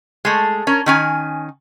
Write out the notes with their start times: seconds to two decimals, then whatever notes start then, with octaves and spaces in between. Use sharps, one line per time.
0.25 G#3 A3
0.67 C#4 A#4
0.86 D#3 C#4 G#5